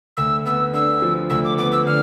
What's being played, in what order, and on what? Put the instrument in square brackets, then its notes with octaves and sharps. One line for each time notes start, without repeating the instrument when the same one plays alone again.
[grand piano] D2 [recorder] E6
[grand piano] B3 [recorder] E6
[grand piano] D3 [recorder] E6
[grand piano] F3
[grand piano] D2 [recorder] E6
[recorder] D6
[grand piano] B3 [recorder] D6
[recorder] E6
[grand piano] D3 [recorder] F6